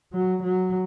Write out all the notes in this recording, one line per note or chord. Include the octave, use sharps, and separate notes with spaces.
F#3
F#3